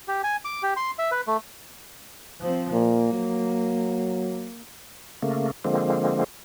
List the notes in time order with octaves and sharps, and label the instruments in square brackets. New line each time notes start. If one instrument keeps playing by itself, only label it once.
[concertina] G4
G#5
D6
G4
C6
E5
B4
A3
[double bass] F3 C4
[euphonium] A#2 [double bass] A#3
[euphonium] F#3
[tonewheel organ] C#3 A3 A#3
D3 F3 G#3 A#3 C4